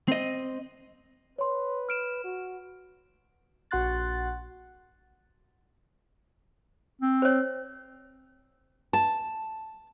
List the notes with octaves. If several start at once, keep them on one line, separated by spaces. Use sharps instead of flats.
C4 D#5
B4 C#5 C6
F6 D7 E7
F#4
A#1 F#4 F#5 C6 F#6 A6
C4
C5 C#5
A5